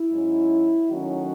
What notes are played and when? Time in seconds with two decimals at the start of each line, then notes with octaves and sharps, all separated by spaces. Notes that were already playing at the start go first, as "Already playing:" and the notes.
Already playing: E4
0.10 G#2 F#3 C#4
0.89 D#3 F#3 A3 C#4 D#4 F#4